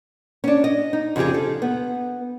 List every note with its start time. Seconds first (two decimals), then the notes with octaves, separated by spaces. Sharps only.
0.44 C#4 D4
0.64 D#5
0.93 D#4
1.16 F2 C#3 E4 G4 G#4
1.34 A4
1.62 B3